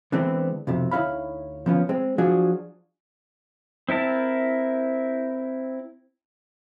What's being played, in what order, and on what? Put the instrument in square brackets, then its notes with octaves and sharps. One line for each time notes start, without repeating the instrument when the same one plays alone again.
[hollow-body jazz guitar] D3 E3 G#3 B3 C4 D4
B1 F2 C3
D2 D#4 E4 C#5 F5 B5
F3 B3 C#4 F4
G#3 C4
F3 F#3 D4 F4 F#4 G#4
[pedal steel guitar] C4 E4 A#4 A5